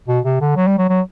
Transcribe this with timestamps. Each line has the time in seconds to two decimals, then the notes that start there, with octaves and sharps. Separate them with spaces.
0.08 B2
0.25 C3
0.41 D3
0.57 F#3
0.67 G3
0.78 F#3
0.90 F#3